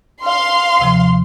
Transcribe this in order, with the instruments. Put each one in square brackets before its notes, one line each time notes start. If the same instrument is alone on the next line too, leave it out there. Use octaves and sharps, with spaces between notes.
[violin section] F5 C6
[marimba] D#2 C3 F3